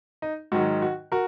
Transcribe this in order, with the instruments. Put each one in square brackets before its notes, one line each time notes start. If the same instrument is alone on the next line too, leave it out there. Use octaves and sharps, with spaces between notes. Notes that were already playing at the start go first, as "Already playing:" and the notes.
[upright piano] D#4
G#2 D#3 F#3 F#4
F#4
F#4 A#4